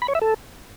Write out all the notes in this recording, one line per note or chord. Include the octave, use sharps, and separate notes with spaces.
B5
C#5
E5
A4